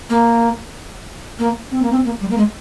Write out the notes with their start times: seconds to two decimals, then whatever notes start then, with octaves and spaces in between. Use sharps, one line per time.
0.10 A#3
1.39 A#3
1.72 C4
1.82 A#3
1.92 C4
2.05 A#3
2.21 G3
2.30 A#3
2.38 G#3